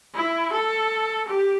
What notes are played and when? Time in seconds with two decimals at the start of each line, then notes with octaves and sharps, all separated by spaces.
0.15 E4
0.52 A4
1.27 G4